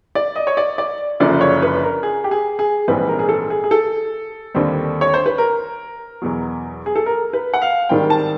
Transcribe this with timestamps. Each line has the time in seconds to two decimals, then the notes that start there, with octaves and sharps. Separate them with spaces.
0.15 D5
0.36 D#5
0.47 C#5
0.57 D5
0.78 D5
1.20 F#1 F#2 D3 F3 D5
1.41 C#5
1.62 B4
1.83 A#4
2.03 G#4
2.24 G4
2.31 G#4
2.59 G#4
2.88 A#1 G#2 E3 G3 C4 B4
3.08 A#4
3.19 G#4
3.29 A4
3.50 G#4
3.64 G#4
3.71 A4
4.54 D#2 D3 G3 C4
5.01 C#5
5.14 C5
5.26 B4
5.38 A#4
6.22 E2 B2 F#3
6.86 G#4
6.96 A4
7.06 A#4
7.33 B4
7.54 F#5
7.62 F5
7.89 G#2 D#3 G3 C4 G5
8.10 A5